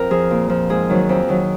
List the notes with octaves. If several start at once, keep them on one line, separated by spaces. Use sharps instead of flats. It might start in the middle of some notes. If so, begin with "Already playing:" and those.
Already playing: F2 A#4
F3 G#4
A#2
F3
G#2 G#4
D#3 F#3
F2
D#3 F#3